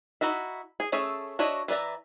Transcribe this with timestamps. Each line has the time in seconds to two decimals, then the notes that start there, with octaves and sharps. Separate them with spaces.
0.21 D#4 E4 F#4 E5
0.80 G#4
0.92 A3 C#4 G#4 A4 E5
1.39 D4 F#4 C#5 D#5 E5
1.68 E3 B4 D5 E5 A#5